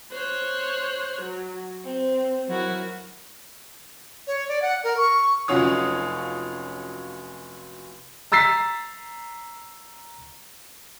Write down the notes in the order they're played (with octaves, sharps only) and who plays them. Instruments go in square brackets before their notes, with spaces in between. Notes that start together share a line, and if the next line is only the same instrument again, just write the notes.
[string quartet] C5 C#5 F#6
F#3
C4
F#3 E4 F#4 A#4
[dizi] C#5
D5
F#5
A#4
C#6
[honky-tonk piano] F1 F#3 C#4 F4 C#5 D#6
[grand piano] A#5 E6 A6 B6 C7